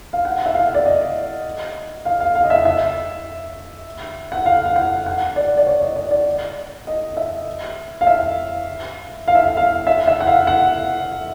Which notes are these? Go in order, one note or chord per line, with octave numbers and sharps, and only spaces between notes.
F5
F#5
E5
F5
D5
D#5
F5
F5
F5
D#5
E5
E5
F#5
F5
F5
F#5
F#5
D5
D5
C#5
D#5
D5
D5
D#5
E5
F5
E5
F5
E5
F5
F5
E5
E5
F#5
F5
F#5